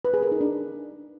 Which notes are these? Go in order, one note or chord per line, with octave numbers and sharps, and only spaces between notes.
B4
G#4
A#4
D#4
D4